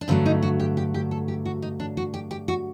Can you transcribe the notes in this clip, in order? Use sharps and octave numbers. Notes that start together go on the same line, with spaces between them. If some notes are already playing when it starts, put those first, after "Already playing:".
D4
G2 D3 F#3 A3 C4
D#4
F#4
G4
G4
G4
A4
G4
F#4
D#4
D4
F#4
G4
G4
F#4